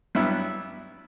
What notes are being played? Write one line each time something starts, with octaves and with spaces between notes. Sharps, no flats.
G2 F#3 B3 E4